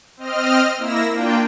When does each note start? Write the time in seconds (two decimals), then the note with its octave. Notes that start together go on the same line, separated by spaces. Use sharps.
0.17 C4 D#5 F6
0.78 A#3 E4 E6 A#6
1.12 A#3 D4 F4 G5